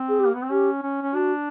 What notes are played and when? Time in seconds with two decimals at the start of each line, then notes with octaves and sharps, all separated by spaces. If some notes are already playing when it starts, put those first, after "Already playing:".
Already playing: C4
0.09 G#4
0.20 G4
0.26 A#3
0.34 B3
0.42 C4
0.51 C#4 G4
0.82 C#4
1.02 C#4
1.14 D4 F#4